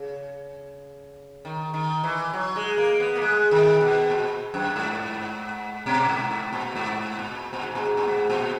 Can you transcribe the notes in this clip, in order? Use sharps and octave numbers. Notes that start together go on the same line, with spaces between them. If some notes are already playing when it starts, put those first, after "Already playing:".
Already playing: C#3
D#3
D#3
E3
F#3
G#3
A#3
B3
A#3
G#3
D#3
B2
A#2
F#2
G#2
B2
G#2
G#2
A#2
G#2
A#2
A#2
G#2
A#2
G#2
A#2
G#2
A#2